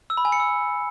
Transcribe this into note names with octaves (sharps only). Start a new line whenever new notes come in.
E6
B5
G#5
C#7
E6